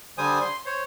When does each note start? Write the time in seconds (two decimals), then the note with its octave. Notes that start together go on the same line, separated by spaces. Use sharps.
0.18 D3 G3 C5 G#5 D#6
0.41 C6
0.66 C5 C#5